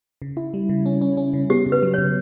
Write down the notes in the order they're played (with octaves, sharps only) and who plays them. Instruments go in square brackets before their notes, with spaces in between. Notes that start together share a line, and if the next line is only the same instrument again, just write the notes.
[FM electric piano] C#3
E4
G3
C#3
C#4
C#4
C#4
C#3
[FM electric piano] B3 [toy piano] G4
[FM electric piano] C#3
[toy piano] B4
[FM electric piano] F#3
[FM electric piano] C#3 [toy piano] C#5